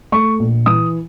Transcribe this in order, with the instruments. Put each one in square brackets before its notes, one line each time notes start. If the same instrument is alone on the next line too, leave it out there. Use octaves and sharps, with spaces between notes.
[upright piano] A3 C#6
A#1
E3 D#6